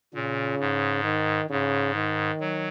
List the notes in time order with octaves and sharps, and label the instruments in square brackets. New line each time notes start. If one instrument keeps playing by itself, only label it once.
[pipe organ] A#2 [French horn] C#3
[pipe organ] G#2
[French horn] D#3
[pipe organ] G#2 [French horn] C#3
[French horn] D#3
[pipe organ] F#3